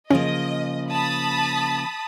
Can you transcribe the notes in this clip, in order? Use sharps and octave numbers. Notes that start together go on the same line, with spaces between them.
C#3 F3 A#3 C#4 D#5
A5 B5 D#6